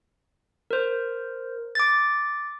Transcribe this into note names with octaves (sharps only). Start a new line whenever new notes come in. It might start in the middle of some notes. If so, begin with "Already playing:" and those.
A#4 C5
D6 A6